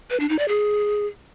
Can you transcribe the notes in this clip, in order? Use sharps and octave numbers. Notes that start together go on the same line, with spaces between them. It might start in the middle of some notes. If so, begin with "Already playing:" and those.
B4
D4
D#4
D5
G#4